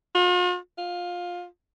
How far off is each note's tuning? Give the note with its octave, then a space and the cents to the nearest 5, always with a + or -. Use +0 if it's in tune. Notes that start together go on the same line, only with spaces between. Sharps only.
F4 +45
F4 +15